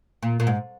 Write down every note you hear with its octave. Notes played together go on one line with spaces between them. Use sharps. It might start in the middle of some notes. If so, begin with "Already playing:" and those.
A#2
A#2
G#2